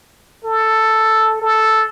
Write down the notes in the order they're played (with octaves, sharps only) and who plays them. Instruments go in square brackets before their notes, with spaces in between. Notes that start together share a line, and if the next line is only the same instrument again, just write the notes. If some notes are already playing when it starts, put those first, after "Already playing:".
[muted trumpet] A4
A4